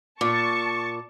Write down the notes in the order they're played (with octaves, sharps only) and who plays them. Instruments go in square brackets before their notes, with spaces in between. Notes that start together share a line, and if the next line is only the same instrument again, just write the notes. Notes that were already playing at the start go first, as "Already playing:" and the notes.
[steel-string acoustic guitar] A#2 [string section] A5 C#6 [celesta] D6